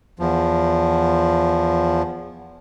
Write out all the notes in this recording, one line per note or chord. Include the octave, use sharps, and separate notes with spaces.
E2 F3